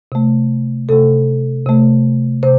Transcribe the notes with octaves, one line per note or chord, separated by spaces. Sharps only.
C3 A3
C3 A3 A4
C3 A3
C3 C5